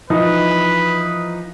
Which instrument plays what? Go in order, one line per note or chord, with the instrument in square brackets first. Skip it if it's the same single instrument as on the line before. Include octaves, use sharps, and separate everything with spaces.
[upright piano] E3 F3 D#4 [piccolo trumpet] B4